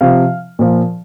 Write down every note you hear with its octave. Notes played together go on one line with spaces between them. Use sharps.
C3 F3 F5
A#2 F3